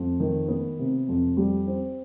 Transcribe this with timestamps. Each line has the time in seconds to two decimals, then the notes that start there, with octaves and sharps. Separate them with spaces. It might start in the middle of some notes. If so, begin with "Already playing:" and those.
Already playing: F2
0.20 D#3
0.48 B3
0.79 C3
1.08 F2
1.37 G3
1.67 C4